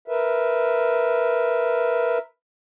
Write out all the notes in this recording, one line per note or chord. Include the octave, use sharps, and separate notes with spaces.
A#4 B4 E5